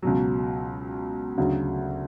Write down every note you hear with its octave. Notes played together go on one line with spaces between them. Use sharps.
C#2 B2 F#3
D2 C#3 F#3